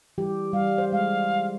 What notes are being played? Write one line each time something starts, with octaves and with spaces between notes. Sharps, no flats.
E3 G3 G4
G3 F5
C5
G#3 F5